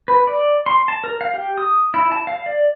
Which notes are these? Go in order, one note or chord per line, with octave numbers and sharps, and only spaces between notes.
B4
D5
C6
A5
A#4
F5
G4
D#6
E4
A5
F5
D5